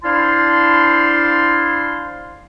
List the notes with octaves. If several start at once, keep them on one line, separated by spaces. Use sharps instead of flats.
D4 E4 C5 F5 A5 C6